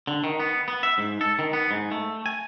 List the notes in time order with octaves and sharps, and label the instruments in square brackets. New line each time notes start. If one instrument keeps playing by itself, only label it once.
[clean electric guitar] D3
D#3
B3
B3
E5
G#2
A4
D#3
B3
G#2
A3
G#5